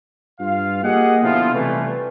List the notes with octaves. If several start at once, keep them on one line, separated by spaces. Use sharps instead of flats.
G2 F4 F5
A#3 G4 G#4 D#5 F#5
B2 D3 F3 E4 F4
C3 E3 G3 A3